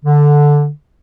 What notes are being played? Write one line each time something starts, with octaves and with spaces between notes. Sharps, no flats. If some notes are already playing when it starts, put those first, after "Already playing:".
D3